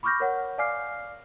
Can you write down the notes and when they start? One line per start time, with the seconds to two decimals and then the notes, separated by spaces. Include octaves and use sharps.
0.03 B5 C#6 D6 F6 G6 A#6
0.20 A#4 C#5 F#5
0.58 D5 F5 G#5 D6 F6 C7